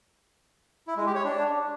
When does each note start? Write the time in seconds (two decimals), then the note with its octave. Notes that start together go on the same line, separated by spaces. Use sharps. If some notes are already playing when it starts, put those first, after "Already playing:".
0.88 E4
0.97 G#3
1.06 G4
1.15 C#5
1.24 D4